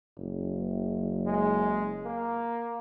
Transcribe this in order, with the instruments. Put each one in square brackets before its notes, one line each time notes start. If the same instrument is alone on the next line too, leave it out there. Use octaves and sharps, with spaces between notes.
[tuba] F#1
[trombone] G#3
A#3